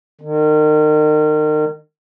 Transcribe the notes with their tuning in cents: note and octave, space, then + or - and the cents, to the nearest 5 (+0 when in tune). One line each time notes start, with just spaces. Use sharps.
D#3 -35